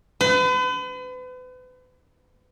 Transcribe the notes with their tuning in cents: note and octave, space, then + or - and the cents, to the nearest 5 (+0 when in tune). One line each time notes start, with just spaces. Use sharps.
B4 +40